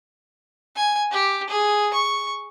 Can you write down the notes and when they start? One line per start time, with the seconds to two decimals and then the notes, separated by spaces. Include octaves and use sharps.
0.76 G#5
1.11 G4
1.49 G#4
1.93 C#6